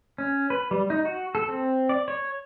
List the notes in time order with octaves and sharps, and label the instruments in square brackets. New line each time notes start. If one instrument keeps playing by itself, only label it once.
[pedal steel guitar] C#4
B4
G3
D#4
F#4
A4
C4
D5
C#5